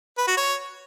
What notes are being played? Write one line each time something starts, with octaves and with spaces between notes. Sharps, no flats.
B4
F#4
C#5